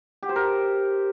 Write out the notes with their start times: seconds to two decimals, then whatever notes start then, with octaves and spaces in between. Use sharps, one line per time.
0.23 G4
0.29 C5
0.36 A#4